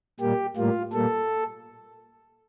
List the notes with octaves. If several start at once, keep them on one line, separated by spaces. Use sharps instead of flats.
A#2 G3 A#3 G4
A2 G3 A#3 F4
A#2 G3 A#3 A4